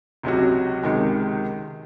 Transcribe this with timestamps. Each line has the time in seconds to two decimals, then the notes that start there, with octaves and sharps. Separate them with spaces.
0.23 C#2 C3 F#3 C#4 F#4
0.83 C#2 C3 D#3 G#3